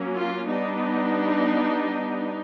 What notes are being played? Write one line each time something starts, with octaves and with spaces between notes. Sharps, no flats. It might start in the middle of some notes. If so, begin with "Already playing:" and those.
Already playing: F#3 A#3 C#4
F4
G3 B3 D4 D#4